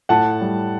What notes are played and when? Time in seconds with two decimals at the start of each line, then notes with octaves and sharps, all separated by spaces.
0.09 A2 F#5 A5
0.41 G3